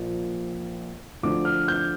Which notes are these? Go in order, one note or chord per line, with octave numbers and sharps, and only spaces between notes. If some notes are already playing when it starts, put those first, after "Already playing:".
Already playing: A#1 A#2 F3 A#3
D2 D3 F3 D6
F6
G6